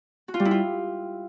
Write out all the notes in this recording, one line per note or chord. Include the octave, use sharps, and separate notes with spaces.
F#4
F4
G3
E4
F4